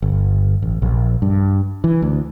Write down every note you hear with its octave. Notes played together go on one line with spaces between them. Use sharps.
G1
A1
A#1
G2
E3
D2